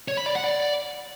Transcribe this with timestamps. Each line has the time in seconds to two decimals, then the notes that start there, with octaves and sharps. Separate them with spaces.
0.08 C#5
0.17 B5
0.26 D5
0.35 F#5
0.44 D5